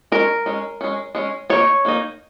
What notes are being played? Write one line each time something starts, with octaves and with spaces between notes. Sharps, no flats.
G#3 C#4 A#4
G#3 C#4
G#3 C#4
G#3 C#4
D#3 A#3 D#4 C#5
D#3 A#3 D#4